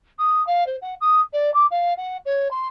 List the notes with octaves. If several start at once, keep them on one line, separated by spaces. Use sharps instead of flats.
D#6
F5
C5
F#5
D#6
D5
D6
F5
F#5
C#5
C6